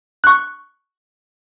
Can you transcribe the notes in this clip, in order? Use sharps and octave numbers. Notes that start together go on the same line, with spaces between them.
C#6 F#6